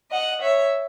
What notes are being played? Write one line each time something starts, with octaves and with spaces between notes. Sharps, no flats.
D#5 F#5
C#5 E5